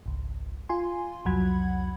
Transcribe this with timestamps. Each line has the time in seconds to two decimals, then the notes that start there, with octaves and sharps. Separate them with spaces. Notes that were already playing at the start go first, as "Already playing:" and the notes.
0.06 G#1 C#2
0.69 F4 G#5 C6
1.25 C2 F2 F#3 F#5 B5 G#6